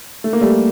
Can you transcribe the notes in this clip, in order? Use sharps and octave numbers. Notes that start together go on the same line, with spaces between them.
A3
A#3
G3 A3